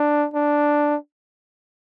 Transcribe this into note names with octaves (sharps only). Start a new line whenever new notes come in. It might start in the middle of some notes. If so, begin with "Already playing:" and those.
Already playing: D4
D4